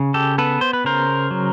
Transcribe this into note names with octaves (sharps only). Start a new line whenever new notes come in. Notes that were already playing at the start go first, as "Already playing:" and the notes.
Already playing: C#3
G4 A4
B3 A4 B4
C5
B4
C#3 A#4 C5
F#3